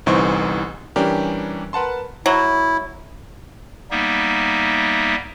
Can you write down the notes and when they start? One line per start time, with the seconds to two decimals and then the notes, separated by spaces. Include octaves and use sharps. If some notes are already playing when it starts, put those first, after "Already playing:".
0.06 G1 C2 E3 D#4 C5 C#6
0.96 E3 G3 C#4 D4 G4 A#4
1.73 A#4 B4 F#5 A5 C6
2.26 F#3 E4
3.91 G3 A#3 B3 D#4 E5